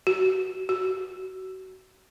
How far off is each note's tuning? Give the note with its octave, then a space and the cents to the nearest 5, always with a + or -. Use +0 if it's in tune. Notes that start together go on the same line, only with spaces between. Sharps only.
F#4 +30
F#4 +30